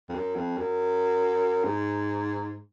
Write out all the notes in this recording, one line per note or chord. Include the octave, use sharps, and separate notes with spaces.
F2
F#2
F2
F#2
G#2